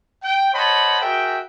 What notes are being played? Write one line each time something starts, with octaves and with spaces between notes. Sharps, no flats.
G5
C5 C#5 D#5 F#5 A5 B5
F#4 G#4 A#4 E5 G5